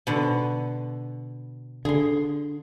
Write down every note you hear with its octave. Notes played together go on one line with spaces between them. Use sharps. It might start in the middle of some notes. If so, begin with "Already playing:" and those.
B2 D3
D3 G#4 C6